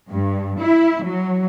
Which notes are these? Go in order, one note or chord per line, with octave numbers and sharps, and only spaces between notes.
G2
E4
F#3